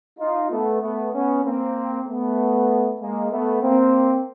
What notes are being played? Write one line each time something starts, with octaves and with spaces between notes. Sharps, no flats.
D#4 F4
A3 B3
A3 B3
B3 C#4
A#3 C4
A3 B3
G#3 A#3
A3 B3
A#3 C4